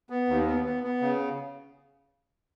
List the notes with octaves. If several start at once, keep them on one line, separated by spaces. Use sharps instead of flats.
B3
D#2
B3
B3
B3
C#3